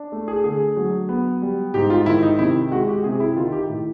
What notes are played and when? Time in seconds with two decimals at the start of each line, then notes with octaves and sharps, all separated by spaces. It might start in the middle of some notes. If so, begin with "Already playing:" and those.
Already playing: D4
0.12 A3
0.28 G#4
0.44 D3 G#4
0.77 F#3
1.09 B3
1.42 G3
1.74 G#2 G4
1.90 F4
2.06 D#3 E4
2.23 D#4
2.39 C3 E4
2.71 G#3 F#4
2.88 G4
3.04 C3 G#4
3.20 E4
3.36 D#3 F4
3.52 G4
3.69 A2